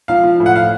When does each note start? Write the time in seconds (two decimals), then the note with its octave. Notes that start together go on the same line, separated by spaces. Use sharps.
0.08 F3 F5
0.24 F3
0.40 A2
0.46 F#5
0.56 F5